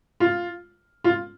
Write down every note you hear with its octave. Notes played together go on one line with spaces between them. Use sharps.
F4
F4